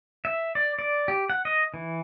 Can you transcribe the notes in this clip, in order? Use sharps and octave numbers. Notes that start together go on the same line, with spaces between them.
E5
D5
D5
G4
F#5
D#5
E3